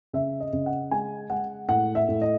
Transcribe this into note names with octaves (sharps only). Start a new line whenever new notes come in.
C#3 E5
D#5
C#3
F#5
G#3 G#5
G#3 F#5
A2 F#5
E5
A2
D#5